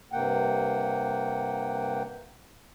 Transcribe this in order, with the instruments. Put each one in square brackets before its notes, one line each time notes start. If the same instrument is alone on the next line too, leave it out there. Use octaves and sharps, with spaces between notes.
[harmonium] G2 C3 A#3 F#5 G5